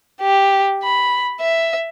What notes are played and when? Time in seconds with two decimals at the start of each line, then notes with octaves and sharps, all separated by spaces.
0.22 G4
0.83 B5
1.41 E5